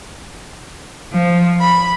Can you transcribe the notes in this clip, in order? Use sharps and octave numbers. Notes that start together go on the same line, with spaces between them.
F3
B5